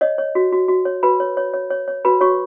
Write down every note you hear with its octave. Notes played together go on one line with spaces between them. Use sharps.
C#5 D#5
C#5
F#4
F#4
F#4
C#5
F#4 B4 B5
C#5
C#5
C#5
C#5
C#5
F#4 B4 B5
F#4 C#5 C#6